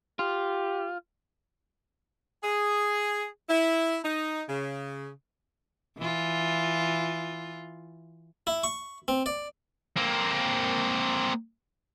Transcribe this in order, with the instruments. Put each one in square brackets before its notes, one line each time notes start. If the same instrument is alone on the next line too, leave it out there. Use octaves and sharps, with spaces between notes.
[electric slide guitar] F4 [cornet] G4
[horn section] G#4
E4
D#4
C#3
[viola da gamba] E3 F4
[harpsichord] E4
C#6
C4
D5
[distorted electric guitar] A#3 C4